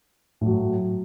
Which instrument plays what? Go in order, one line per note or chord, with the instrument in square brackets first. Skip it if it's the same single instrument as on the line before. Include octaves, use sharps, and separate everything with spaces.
[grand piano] A2 F#3